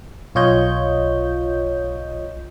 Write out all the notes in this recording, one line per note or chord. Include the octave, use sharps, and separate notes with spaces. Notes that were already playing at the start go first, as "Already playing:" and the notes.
B1 F4 C#5 D#5 G6